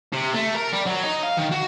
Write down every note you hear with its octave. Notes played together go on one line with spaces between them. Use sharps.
C3
A3
A#4
G3
F#3
D#4
F5
D#3
F#4